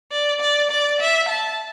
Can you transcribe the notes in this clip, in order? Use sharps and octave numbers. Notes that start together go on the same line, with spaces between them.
D5
D5
D5
E5
A5